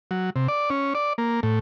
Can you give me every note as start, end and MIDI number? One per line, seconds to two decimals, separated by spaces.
0.11 0.30 54
0.36 0.48 48
0.48 0.70 74
0.70 0.94 61
0.95 1.13 74
1.18 1.40 58
1.43 1.59 45